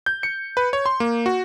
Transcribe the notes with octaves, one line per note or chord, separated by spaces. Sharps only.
G6
C#7
B4
C#5
C6
A#3
F#4